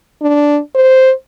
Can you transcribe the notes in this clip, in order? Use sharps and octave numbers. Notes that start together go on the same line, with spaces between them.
D4
C5